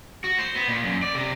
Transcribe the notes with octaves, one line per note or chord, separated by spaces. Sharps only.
F#4
C5
B3
A#2
F#2
D5
C3